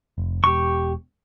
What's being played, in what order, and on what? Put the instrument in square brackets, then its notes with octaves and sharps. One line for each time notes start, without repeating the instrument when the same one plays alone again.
[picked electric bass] F1
[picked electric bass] E1 [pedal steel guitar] G4 C#6